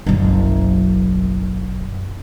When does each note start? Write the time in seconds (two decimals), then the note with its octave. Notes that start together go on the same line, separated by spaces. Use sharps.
0.06 F#1 B1